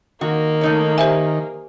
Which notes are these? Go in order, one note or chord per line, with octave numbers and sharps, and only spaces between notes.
D#3 A#3 F#4
A3 D#4 C#5
G4 C5 E5 G#5